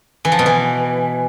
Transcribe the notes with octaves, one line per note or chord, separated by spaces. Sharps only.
E3
F3
B2
E3